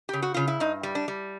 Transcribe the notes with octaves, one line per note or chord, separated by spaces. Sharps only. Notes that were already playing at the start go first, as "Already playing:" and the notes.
C#3 G4
F#4
C#3 F4
E4
G2 D#4
G3
D4
G3